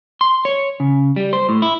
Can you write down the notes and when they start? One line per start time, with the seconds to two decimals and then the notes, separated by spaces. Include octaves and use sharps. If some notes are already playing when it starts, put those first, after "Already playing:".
0.21 C6
0.45 C#5
0.80 C#3
1.16 G3
1.33 C5
1.49 A2
1.62 E4